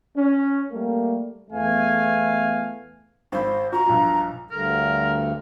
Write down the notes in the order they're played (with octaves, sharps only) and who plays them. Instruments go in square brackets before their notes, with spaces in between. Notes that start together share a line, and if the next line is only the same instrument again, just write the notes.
[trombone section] C#4
G3 A3 A#3
[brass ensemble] E2 A3 B3 F5 G#5
[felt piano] G#1 B5 [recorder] C5
[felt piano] F#4 [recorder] A#5
[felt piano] B1 G2 F3
[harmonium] D2 G2 D3 [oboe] A#4